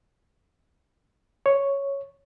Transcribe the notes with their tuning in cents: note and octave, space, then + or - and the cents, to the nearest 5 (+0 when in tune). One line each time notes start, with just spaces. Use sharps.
C#5 +0